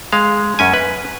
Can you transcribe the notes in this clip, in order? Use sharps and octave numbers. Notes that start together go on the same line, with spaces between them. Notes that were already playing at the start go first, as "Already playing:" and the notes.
G#3 F5
F#2 C#4 G#5
B4